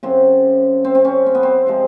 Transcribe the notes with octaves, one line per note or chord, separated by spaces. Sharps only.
F#2 C#3 F#3 C4
C4
C4
C#4
C4
B3
C4
C3 F3 G#3